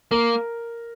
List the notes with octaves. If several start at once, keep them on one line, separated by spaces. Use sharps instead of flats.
A#3 A#4